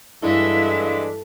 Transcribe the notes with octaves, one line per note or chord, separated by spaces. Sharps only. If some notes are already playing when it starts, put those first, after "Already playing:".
G2 E3 G#3 A3 D4 E4 E5 F5